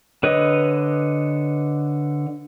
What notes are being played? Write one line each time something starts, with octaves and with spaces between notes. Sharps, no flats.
D3 B4 C#5 D#5